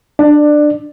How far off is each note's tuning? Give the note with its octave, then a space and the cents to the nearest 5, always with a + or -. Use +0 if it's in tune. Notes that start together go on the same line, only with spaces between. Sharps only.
D4 +15 D5 +20